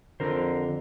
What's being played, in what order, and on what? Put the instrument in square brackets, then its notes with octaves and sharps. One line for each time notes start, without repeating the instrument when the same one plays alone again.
[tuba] F2 [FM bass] D3 [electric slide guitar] A#4 C5